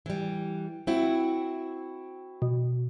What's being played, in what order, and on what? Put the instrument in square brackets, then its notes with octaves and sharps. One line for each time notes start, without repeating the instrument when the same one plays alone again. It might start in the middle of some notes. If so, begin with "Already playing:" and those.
[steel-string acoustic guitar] E3 G3
C4 E4 F#4
[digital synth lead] B2